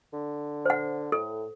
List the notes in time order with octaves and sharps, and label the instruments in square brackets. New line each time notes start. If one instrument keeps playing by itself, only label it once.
[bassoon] D3
[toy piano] C5 F#5
[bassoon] A2 [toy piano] A4